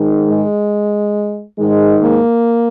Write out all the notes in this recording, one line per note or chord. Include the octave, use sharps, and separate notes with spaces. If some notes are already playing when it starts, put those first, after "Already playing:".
Already playing: G#2 D#3
G#3
G#2 D#3 G#3
A#3